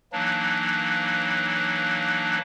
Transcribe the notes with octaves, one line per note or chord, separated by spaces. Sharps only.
E3 F#3 A#3 D4 D#4